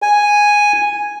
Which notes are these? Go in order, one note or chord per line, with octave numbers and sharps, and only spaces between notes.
G#5